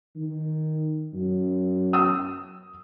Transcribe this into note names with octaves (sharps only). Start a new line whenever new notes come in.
D#3
F#2
D#6 E6